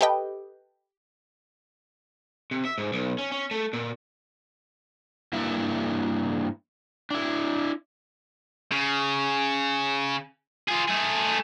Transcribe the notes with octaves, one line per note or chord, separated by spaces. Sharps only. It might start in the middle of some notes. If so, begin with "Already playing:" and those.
G4 A4 B4 D#5 G5
C3
E5
G#2
B1
C#4
C#4
A3
A#2
G2 A#3 E4 E5
D4 E4
C#3
F4 G#4
A3 G#4